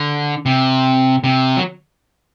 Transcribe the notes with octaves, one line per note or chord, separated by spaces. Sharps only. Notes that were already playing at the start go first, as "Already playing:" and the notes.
Already playing: D3
C3
C3
F#3